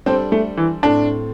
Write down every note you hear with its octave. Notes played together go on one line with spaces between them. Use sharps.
G3 C4 D4 A4 C5
A3
E3
A2 A3 C4 D4